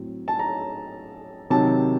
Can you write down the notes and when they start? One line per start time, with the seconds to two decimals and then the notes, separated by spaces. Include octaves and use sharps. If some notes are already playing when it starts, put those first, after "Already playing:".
Already playing: A2 F#3 C4
0.28 A5
0.39 A#5
1.50 C3 D#3 F#3 A5